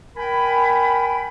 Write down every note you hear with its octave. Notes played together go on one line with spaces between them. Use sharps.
A#4 G5 G#5 B5